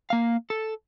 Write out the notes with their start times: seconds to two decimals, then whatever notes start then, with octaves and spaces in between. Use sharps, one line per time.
0.10 A#3 F5
0.50 A4